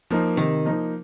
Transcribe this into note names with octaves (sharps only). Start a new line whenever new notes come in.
F3 A#3 D#4
C3 D#3
F3 A#3 D#4